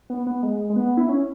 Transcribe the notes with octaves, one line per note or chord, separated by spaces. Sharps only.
B3
B3
G#3
G#3
B3
E4
C#4